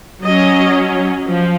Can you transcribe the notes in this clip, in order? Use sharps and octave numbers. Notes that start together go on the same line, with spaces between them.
F#3 C#4 D#5
F3